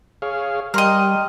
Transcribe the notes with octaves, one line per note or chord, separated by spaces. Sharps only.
G#4 C#5 F5
G3 A#4 D#5 G5 C6 F6